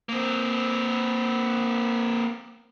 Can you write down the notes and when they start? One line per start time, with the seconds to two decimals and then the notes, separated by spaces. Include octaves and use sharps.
0.09 A#3 C4